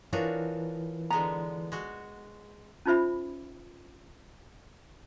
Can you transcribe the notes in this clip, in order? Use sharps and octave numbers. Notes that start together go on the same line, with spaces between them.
E3 D4 D#4 F4 F#4 A#4 C#5
D3 G#3 B3 A#5
G#3 F#4
C#4 D#4 F4 C5 E5 B5